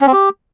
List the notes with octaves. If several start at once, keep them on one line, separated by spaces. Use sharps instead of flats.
C#4
C4
G4